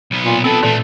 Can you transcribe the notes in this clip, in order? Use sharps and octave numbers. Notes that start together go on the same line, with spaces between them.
B1 B3
A#2
B2 C4 E4 A4
A#2 E3 A3